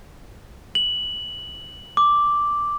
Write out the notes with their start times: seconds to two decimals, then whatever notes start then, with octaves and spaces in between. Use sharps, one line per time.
0.75 F#7
1.97 D6